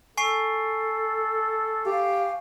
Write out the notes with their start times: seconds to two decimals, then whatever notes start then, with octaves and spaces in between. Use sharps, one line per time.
0.17 A4 G#5 C#6 C7
1.86 G4 F5